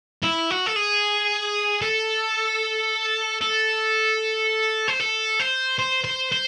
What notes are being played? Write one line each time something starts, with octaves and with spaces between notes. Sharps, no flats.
E4
F#4
A4
G#4
A4
A4
C5
A4
C5
C5
C5
C5